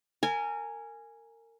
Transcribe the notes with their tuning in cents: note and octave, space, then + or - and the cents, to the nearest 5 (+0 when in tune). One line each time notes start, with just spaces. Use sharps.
A#4 -30 G#5 +0